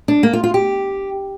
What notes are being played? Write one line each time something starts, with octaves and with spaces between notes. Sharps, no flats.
D4
A#3
F4
F4
G4